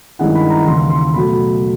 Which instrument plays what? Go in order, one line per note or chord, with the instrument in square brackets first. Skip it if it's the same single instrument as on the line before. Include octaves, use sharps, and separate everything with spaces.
[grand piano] G2 D#3 G#3 C#4 E4 F#5
B5
A#5
D#2 C#3 E3 C6
C6
B2 F#3 A3 B5